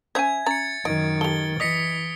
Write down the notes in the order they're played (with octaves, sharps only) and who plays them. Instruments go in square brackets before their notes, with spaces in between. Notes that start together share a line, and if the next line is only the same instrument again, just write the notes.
[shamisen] C#4 C5 [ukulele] E5 G#5 [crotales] G#6
[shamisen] C#4 A#5 [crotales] A6 C#7
[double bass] F#2 D#3 [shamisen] D#5 [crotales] D7
[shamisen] G4 A4 [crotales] G7
[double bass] E3 [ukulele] D#5 [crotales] D#6 B6 C#7